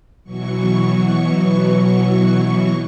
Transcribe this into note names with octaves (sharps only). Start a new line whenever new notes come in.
B2 E3 F#3 C#6